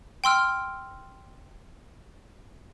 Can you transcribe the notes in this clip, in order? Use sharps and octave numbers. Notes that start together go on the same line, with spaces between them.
G5 C6 E6 F6